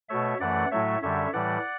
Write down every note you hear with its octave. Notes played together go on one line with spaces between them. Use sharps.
B2 A3 C#5 E5
F#2 E3 A3 D5 F#5
A2 F#3 A3 C#5 E5
F#2 D3 G3 C#5 E5
A2 E3 G3 D5 F#5